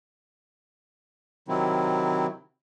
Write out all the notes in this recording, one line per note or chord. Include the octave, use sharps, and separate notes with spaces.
C3 D#3 F#3 C4 E4